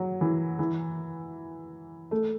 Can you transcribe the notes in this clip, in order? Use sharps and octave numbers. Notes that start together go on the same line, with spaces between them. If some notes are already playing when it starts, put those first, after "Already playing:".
Already playing: F#3
E3
E3
A3